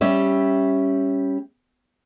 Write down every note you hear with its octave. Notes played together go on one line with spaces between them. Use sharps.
G3 C#4 G4 E5